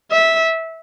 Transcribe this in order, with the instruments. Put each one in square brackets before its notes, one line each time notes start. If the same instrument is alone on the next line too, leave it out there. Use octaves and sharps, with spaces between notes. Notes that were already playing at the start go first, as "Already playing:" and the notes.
[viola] E5